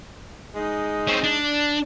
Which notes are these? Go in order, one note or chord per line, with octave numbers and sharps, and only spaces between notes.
G#3 D#4
C4 C#4
D4